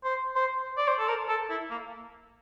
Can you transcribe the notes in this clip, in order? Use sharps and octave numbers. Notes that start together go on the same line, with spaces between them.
C5
C5
D5
C5
A4
A#4
A4
E4
A#3